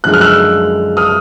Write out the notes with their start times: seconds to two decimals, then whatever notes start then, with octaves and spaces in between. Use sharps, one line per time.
0.04 F#2 D3 F3 G#3 F#6
0.14 F6
0.21 E6 F#6
0.97 D#6 F6